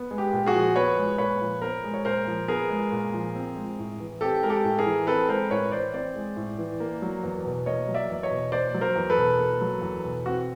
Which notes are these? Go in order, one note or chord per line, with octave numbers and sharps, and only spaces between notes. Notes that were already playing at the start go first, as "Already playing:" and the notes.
Already playing: B3
G#3
G4
A#2
F#4 G#4
F3
B3 B4 C#5
G#3
A#2 B4 C#5
F3
B3 A#4 C5
G#3
C#5
A#2 A#4 C5
F3
B3 G#4 A#4
G#3
A#2
F3
C4
G#3
A2
E3
C4 G4 A4
G#3 A#4
G4 A4
A2
G#4 A#4
E3
C4 A4 B4
G#3 A#4 C5
A2 B4 C#5
E3 C5 D5
C4 C5 D5
G#3
A2
E3
A#3
F#3
E2
B2
A#3 C#5 D#5
F#3
D5 E5
E2
C#5 D#5
B2
A#3 C5 D5
F#3
A#4 C5
E2
A4 B4
B2
A#3
F#3
E2
B2
C4 F#4